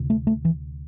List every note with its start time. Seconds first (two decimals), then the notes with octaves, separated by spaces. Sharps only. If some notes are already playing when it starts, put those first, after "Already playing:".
Already playing: D2 C3
0.10 A3
0.27 A3
0.45 E3